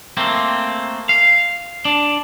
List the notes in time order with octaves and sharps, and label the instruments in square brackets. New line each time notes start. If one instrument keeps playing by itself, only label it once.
[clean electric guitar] A3 A#3 C4
F5
D4